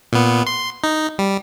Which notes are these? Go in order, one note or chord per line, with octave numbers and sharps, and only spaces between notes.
A#2 B3
C6
D#4
G3